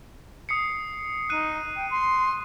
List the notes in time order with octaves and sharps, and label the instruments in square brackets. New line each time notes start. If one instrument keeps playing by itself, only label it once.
[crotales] D#6 C7 C#7
[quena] D#4 [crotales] F#6 D#7
[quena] G5
C6